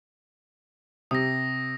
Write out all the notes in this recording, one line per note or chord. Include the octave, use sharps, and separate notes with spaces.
C3 D#6 A#6